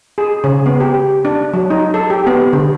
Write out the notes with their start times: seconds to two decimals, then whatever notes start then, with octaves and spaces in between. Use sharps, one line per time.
0.18 G#4
0.44 C#3
0.66 B3
0.80 G4
1.25 D4
1.54 F#3
1.70 D#4
1.94 A4
2.10 G4
2.27 B3
2.53 D3